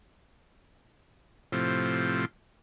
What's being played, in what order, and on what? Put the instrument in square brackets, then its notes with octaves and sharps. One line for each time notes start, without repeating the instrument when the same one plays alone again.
[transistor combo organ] A2 C3 F3